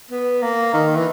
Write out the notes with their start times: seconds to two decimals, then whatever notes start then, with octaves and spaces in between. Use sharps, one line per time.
0.11 B3
0.42 A#3
0.73 D#3
0.96 E3